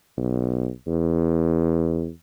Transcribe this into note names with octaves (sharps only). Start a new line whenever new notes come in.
B1
E2